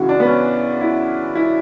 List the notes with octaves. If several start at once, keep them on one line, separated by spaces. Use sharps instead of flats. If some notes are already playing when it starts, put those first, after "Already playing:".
Already playing: F#2 C#3 E3 F#4
D4
B3
C#4
E4
E4